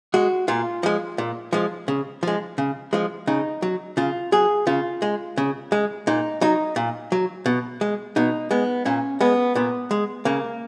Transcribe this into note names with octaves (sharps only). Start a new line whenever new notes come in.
G#3 F#4
A#2 F4
F3 G#3
A#2
F3 G#3
C#3
F3 G#3
C#3
F3 G#3
C#3 D#4
F#3
C#3 F4
F#3 G#4
C#3 F4
G#3
C#3
G#3
A#2 D#4
F#3 D#4
A#2
F#3
B2
G#3
B2 D#4
G#3 B3
A#2 C#4
G#3 B3
A#2 B3
G#3
C#3 A#3